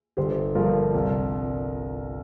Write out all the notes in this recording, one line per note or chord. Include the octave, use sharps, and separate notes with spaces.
G1 G4 C5
G2 F3 F4 A#4
C2